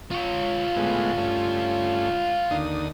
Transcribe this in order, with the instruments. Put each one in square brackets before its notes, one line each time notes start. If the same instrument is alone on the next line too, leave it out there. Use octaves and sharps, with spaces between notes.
[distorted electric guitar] F4 C#5
[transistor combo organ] A2 G#3 B3
G2 A3 C#4
D#2 D3 D#6